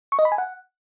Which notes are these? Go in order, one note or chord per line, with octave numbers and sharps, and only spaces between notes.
C#6
D#5
B5
G#5
F#5